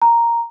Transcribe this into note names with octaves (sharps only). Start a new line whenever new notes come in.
A#5